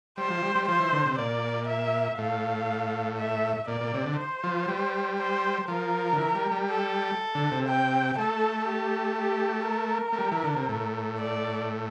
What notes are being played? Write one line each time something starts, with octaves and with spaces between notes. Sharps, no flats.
G3 C5
F3
G3
G3
F3 C5
E3
D3
C3
A#2 D5
E5
A2 F5
E5
A#2 D5
A#2
C3
D3
C5
F3
G3
C5
F3 A#4
D3
E3
G3
G3
A4
D3
C3
G5
A3 A4
G4
G4
A#4
A3
G3
E3
D3
C3
A2
D5